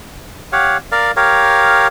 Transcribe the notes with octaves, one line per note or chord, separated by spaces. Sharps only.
G4 C#5 F5 F#5
A#4 D5 F5
G4 A#4 C#5 F5